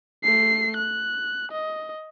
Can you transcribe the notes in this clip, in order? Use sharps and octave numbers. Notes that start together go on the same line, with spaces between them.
A3 C7
F#6
D#5